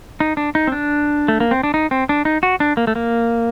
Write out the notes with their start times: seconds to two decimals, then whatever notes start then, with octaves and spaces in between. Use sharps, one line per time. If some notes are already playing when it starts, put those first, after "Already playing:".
0.20 D#4
0.37 D4
0.55 D#4
0.67 C4
0.72 D4
1.28 A3
1.40 A#3
1.51 C4
1.63 D4
1.74 D#4
1.91 C4
2.09 D4
2.25 D#4
2.43 F#4
2.60 D4
2.77 A#3
2.87 A3
2.95 A#3